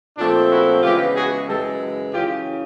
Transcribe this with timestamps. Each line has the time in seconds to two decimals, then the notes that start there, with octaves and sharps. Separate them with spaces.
0.18 A#2 F3 A3 C4 D4
0.51 E4 F#4
0.83 C#3 E3 G#3 B3 F4 G4
1.15 F#4 G#4
1.48 F#2 C#3 E3 G#3 G4 A4
2.13 F#2 C#3 E3 F4 G4